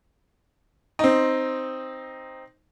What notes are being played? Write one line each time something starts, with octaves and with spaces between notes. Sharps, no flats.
C4 D#4